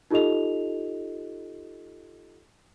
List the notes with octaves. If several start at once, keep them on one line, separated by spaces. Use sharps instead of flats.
D#4 F4 G4 A4 D#5 F7